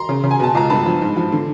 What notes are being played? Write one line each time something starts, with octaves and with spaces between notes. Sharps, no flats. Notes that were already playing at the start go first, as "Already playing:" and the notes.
Already playing: A#5 C6
C#3
C#3
G#5
B2 A5
C#2 A#5
G2 A5 B5
F3
G#2
F3
D3